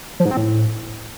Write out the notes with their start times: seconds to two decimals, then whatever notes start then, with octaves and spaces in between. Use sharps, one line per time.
0.20 F3
0.25 G#2
0.31 C4
0.37 A2